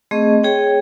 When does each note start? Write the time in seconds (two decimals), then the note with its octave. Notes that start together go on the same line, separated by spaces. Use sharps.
0.11 A3 C4 G#4 D#5 C#6
0.43 G#4 C#5 G5